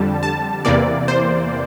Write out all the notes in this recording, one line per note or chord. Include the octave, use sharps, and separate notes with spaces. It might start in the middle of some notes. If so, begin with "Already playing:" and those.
Already playing: F2 D3 G3 A5
A5
E2 C3 E3 A#3 D5
C5